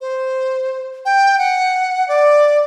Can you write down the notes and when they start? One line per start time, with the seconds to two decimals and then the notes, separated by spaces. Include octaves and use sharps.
0.01 C5
1.05 G5
1.38 F#5
2.08 D5